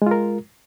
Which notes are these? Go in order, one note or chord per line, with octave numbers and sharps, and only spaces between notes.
G#3 F4 A#4